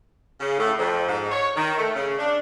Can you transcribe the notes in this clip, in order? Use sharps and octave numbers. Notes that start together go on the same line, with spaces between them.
C#3
A2
F2
G#2
C#5
D#3
A3
C#3
D4